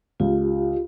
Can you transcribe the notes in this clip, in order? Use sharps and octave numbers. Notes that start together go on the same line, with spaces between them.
C#2 F4 G4